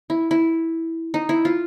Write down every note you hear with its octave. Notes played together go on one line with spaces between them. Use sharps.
E4
E4
D#4
E4
F4